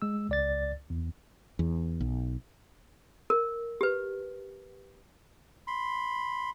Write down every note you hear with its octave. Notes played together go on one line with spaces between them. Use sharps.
G#3 E6
C#2 D5 A6
E2
E2
B1
A#4
G4 B4
B5 C6